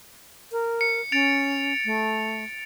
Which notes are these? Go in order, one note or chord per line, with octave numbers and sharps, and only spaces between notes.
A#4
C#7
C#4 A6 D7 F7
A3